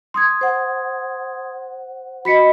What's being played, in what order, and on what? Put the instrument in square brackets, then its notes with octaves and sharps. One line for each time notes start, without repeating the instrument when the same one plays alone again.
[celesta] C6 D#6 G#6
[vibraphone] C5 F#5
[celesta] F#4 B6 C#7 [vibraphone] D#5 B5